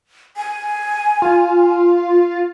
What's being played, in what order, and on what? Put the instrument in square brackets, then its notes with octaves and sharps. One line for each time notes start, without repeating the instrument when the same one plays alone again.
[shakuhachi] G#5
[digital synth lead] F4